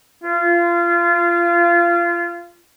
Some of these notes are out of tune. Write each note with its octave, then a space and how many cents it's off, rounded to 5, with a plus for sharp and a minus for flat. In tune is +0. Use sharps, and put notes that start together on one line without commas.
F4 -25